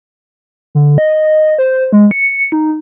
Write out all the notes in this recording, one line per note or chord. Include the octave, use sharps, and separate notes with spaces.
D3
D#5
C5
G#3
C#7
D#4